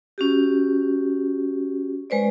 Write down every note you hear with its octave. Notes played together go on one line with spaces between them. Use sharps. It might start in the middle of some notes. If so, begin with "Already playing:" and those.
C#4 F#4 G4
G#3 B4 C5 D5